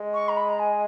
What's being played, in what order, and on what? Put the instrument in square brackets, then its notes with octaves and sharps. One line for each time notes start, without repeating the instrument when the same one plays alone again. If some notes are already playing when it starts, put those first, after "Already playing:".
Already playing: [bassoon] G#3
[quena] C#6
A#5
B5
A#5
G#5